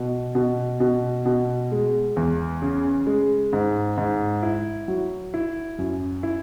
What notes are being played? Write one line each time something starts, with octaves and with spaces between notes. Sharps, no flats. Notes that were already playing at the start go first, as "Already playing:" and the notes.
Already playing: B2
B2
B2
B2
G#3
E2
C#3
G#3
G#2
G#2
E4
F#3
E4
F#2
E4